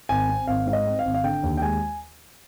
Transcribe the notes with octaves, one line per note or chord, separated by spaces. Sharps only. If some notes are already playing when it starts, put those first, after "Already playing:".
G#1 G#5
C4
G#1 F5
G#2 F5
D#5
C4
F5
G#1
F5
D3 G5
D#2
G5
G#3 G#5